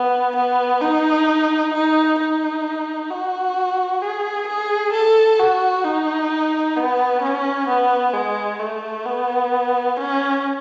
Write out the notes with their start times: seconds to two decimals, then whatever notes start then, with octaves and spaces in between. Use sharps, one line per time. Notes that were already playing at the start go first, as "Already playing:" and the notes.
Already playing: B3
0.36 B3
0.81 D#4
1.74 D#4
2.19 D#4
3.10 F#4
4.02 G#4
4.47 G#4
4.93 A4
5.39 F#4
5.85 D#4
6.76 B3
7.22 C#4
7.68 B3
8.13 G#3
8.59 A3
9.05 B3
9.97 C#4